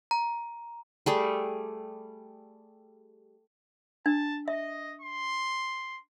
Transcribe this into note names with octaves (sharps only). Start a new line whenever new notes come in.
A#5
G3 A3 G#4
D4 A5
D#5 E5
C6